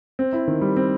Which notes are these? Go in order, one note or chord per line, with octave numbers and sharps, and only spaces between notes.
C4
E4
D#3
G3
C4